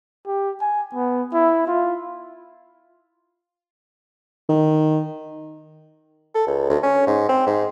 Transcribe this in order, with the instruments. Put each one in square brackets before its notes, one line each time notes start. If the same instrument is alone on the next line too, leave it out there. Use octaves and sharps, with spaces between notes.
[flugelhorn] G4
G#5
B3
E4
F4
[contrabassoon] D#3
[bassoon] A4
C#2
D2
C#4
G#2
C4
G#2